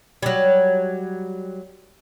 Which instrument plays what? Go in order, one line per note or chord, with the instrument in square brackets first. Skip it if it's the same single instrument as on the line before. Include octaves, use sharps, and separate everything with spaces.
[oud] F#3 G3